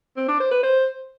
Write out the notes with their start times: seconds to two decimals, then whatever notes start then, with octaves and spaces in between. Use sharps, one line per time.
0.17 C4
0.28 D4
0.40 C5
0.51 B4
0.63 C5